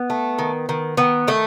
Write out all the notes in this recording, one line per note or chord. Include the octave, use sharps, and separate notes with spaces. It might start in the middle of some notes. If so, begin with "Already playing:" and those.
Already playing: B3
A3
D#3
D#3
D#3 B3
D#3 A3